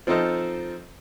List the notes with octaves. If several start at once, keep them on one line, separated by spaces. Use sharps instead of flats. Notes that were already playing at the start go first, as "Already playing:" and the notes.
F3 C4 D#4 A4 D#5 F6